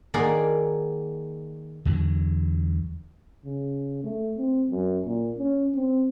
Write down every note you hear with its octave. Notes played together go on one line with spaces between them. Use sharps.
D#3 A#3 G#4 A#4 D5 F#5
E2 D3 F#3
C#3
A3
C4
F#2
A#2
C#4
C4